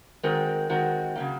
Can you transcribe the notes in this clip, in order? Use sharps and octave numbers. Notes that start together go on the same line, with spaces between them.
D#3 G#3 C4 F#4 A#4
D#3 G#3 C4 F#4 A#4
C#3 F#3 A#3